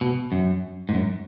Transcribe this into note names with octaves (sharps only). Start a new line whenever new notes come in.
B2
F#2
G#2
F#2